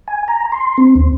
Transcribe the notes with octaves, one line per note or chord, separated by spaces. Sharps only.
G#5
A#5
C6
C4
D#2